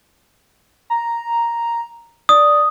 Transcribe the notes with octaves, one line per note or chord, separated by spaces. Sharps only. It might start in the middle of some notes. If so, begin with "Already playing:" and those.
A#5
D5 D#6